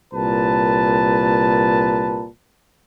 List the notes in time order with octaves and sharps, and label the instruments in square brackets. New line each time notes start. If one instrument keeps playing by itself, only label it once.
[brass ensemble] C2 A#2 B4 A5